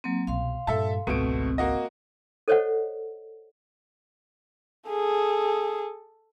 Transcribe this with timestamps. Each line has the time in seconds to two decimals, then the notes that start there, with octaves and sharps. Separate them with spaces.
0.04 F#3 A#3 C4
0.27 C2 B2 F5 C6
0.67 G2 A#2 A4 E5 A5
1.07 G#1 C#2 B2 A3 C4 D7
1.58 A#3 F#4 D#5
2.48 A4 C5 C#5 D#5 F#5
4.89 G#4 A4